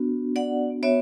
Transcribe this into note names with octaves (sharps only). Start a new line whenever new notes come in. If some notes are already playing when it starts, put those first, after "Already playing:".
Already playing: B3 D4 F#4
D5 F#5
B3 F#4 C#5 E5